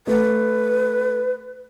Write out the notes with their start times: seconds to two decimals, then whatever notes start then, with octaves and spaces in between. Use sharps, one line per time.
0.07 A3 B4